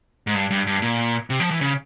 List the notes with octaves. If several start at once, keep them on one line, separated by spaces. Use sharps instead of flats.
G#2
G2
G2
G2
A#2
C3
F3
E3
C#3